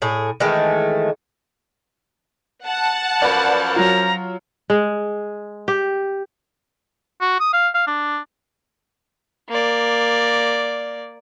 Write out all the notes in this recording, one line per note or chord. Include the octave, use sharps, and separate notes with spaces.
A2 G#4
D#3 E3 G#3 A3
F#5 A5
F#2 F3 A#4 B4 D5
F#3 F4 A#5
G#3
G4
F#4
D#6
F5
F5
D4
A#3 D5